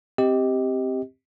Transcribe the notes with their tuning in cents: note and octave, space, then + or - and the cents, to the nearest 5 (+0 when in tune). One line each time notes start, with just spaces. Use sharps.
C4 +0 G4 +0 D#5 +15